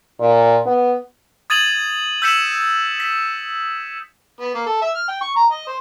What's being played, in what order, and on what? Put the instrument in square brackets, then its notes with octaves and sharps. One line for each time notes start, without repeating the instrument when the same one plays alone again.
[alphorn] A#2
B3
[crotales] D#6 G#6 A6 D#7 F7 F#7
E6 G6 B6 C#7 E7 F#7
B6
[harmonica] B3
A#3
A4
E5
F6
G5
C#6
A#5
D#5
C5